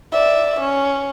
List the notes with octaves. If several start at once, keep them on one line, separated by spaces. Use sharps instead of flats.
D5 E5
C#4